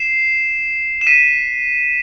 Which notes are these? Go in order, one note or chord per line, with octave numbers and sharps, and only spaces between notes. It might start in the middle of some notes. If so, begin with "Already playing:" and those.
Already playing: C7 E7
E7
B6 D#7